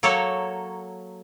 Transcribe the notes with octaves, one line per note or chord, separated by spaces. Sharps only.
F#3 A#3 A4 C#5